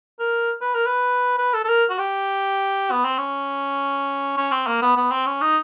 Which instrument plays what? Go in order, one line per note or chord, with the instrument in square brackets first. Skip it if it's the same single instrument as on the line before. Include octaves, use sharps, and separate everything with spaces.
[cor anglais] A#4
B4
A#4
B4
B4
A4
A4
A#4
F#4
G4
B3
C4
C#4
C#4
C4
A#3
B3
B3
C4
C#4
D#4